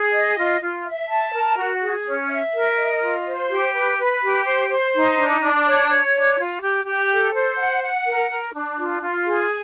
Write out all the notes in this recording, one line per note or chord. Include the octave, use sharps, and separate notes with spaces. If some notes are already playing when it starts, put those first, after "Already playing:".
Already playing: G#4
D#5
F4
F4
E5
A5
A#4
F#4
G#4
C#4
E5
A#4
D#5
F4
C5
G4
B4
B4
G4
C5
C5
D#4
D4
D4
C#5
C#5
D4
F4
G4
G4
A4
C5
F#5
F#5
A#4
A#4
D4
F4
F4
G#4